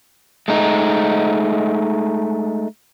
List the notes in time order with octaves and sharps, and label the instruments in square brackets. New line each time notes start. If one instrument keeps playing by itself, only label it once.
[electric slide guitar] G#3 A3 D#4